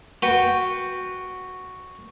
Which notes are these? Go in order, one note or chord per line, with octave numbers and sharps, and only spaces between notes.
F#4 B4 G5